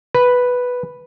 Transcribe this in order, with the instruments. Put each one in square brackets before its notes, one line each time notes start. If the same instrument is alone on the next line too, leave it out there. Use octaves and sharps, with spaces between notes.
[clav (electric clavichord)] B4